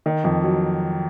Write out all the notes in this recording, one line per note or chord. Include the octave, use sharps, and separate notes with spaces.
D#3
F2
F#3